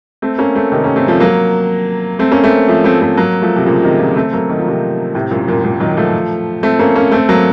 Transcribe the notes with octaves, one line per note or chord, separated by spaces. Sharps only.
A3 C4
A#3 C#4
A3 C4
C3 D#3
A#3 C#4
A3 C4
F3 A3
F#3 A#3
A3 C4
A#3 C#4
A3 C4
F3 A3
A3 C4
A3 C4
F#3 A#3
F3 A3
C3
A#2 C#3
C3 D#3
C#3 F3
A3 C4
F#3 A#3
D#3
F3
C3 D#3
A2 C3
F#2 A#2
F#2 A#2
F#2 A#2
D#3 F#3
F3 A3
A3 C4
A#3 C#4
A#3 C#4
A3 C4
F#3 A#3